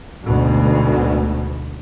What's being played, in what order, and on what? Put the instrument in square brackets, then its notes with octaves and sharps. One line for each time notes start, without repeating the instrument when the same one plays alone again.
[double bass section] D2 G#2 B2